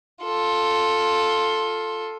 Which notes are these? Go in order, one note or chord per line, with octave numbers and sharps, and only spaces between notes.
F4 A4